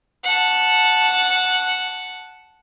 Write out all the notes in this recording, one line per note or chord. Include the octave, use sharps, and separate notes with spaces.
F#5 A5